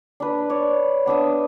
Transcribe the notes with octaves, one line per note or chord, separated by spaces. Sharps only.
D4 B4
C#5 D5
B3 D4 E5 D#6